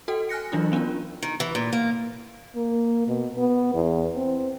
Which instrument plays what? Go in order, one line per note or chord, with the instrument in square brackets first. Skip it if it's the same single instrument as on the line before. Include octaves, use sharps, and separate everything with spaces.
[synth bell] F#4 A4 G5
G#5 F6 F#6 A#6 C#7
E3 F#3 D4 E4 F4
B3 C#4 D4 E4 F4
[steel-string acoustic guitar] D#3
E3
A#2
A#3
[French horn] A#3
B2
B3
E2
C4